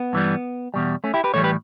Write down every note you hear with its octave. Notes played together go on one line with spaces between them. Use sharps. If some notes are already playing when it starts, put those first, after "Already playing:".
Already playing: B3
G2 E3 G3
E2 B2 G3
A3 C#4
E4 G4
G4 B4
A2 E3 G3 A4 C#5
G4 B4